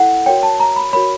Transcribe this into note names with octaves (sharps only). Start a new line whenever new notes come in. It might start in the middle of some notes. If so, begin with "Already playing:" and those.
Already playing: E4 A4 F#5
F#4 A#4 C#5 G5
A5
A#5
B5
F#4 A#4 C#5 B5